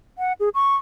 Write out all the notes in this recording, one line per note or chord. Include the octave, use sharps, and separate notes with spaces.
F#5
G#4
C#6